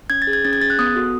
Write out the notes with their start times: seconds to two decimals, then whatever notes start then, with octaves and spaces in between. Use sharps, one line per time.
0.10 C#4 G#6
0.22 A6
0.27 G#4
0.33 G#6
0.45 C#4 A6
0.53 G#6
0.61 G#4 A6
0.70 F#6
0.79 B3 D#6
0.96 F#4 A4